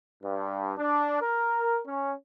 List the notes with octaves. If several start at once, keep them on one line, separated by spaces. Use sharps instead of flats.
G2
D4
A#4
C#4